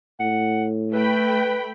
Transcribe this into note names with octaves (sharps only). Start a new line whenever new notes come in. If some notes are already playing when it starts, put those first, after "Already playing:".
A2 F#5
A3 B4 G5 B5